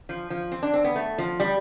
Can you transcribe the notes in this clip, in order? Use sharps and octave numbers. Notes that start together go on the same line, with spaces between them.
F3
F3
C4
D4
C4
B3
A3
F3
G3